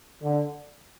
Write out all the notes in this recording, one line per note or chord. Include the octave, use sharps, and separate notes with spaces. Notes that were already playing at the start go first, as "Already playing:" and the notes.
D3